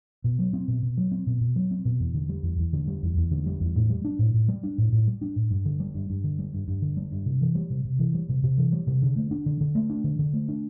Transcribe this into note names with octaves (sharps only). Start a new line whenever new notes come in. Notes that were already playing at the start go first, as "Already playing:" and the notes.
B2
F#3
C4
B2
B2
F#3
C4
B2
B2
F#3
C4
B2
E2
D3
G3
E2
E2
D3
G3
E2
E2
D3
G3
E2
A2
G3
D4
A2
A2
G3
D4
A2
A2
G3
D4
A2
G2
D3
G3
G2
G2
D3
G3
G2
G2
D3
G3
G2
C3
E3
G3
C3
C3
E3
G3
C3
C3
E3
G3
C3
D3
A3
D4
D3
D3
A3
D4
D3
D3
A3
D4